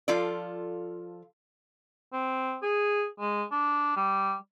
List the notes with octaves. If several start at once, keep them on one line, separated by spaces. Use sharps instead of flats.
F3 F4 A4 D5
C4
G#4
G#3
D4
G3